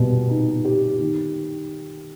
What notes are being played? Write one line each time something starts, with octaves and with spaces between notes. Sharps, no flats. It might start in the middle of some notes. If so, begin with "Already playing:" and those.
Already playing: B2 G3
D#4
G4
D#3